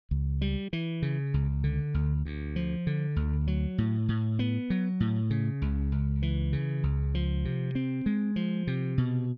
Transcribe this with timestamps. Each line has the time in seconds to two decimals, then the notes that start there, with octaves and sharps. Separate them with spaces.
0.11 C#2
0.41 G3
0.73 E3
1.02 C#3
1.34 C#2
1.64 D3
1.94 D2
2.25 D2
2.56 F3
2.87 D3
3.16 D2
3.47 F#3
3.78 A2
4.09 A2
4.39 B3
4.70 F#3
5.00 A2
5.30 C#3
5.62 C#2
5.92 C#2
6.22 E3
6.53 C#3
6.83 C#2
7.15 F3
7.45 C3
7.75 C4
8.06 G#3
8.36 F3
8.67 C3
8.98 B2